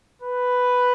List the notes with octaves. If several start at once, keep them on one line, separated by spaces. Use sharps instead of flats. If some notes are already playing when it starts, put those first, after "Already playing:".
B4